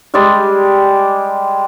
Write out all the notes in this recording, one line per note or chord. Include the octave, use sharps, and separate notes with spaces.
G3 G#3 G4 D5